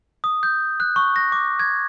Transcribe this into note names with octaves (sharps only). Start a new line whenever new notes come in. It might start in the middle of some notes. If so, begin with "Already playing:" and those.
D#6
G6
F#6
C#6
A#6
D6
G#6